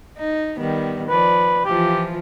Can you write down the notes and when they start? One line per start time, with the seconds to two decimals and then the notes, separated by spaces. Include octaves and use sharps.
0.18 D#4
0.57 D#3 G3 B3
1.09 F3 B4 D5
1.65 E3 F3 F4 G4